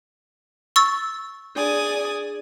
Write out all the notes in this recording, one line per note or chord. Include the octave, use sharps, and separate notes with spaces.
C#6 E6 A6
D4 G#4 D5 G#5 D#6